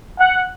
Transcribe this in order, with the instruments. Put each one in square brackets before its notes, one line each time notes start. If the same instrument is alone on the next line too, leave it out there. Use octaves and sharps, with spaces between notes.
[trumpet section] F#5